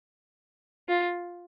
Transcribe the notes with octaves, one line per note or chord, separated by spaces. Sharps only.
F4